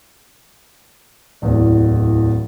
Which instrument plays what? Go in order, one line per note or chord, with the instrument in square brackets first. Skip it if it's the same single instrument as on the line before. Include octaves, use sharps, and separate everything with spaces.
[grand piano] D1 E2